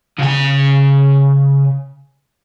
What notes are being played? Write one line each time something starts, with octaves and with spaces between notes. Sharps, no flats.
C#3 G#5